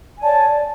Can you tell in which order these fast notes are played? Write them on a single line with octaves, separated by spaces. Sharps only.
G#5 D5 A5 C#5